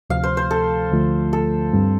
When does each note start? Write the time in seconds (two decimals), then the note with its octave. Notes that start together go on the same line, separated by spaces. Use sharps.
0.09 D2 C3 F3 F5
0.23 C5
0.37 C5
0.51 A4
0.92 D2 D3 F3 A3 F4
1.33 A4
1.73 G2 G3 C4